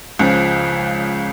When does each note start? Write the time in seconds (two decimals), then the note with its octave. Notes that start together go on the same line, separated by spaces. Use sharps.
0.19 C#2 C#3 F3